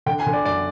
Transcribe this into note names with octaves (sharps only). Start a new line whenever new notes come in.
D3 G5
G#5
D3
D5
F#2 D5